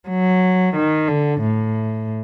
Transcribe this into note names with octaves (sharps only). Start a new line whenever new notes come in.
F#3
D#3
D3
A2